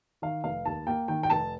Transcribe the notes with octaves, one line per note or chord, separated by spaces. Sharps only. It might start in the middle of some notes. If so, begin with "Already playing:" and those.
D#3 F5
F1 F5
D#2 A5
A#3 G5
D#3 G5
G5
F1 A5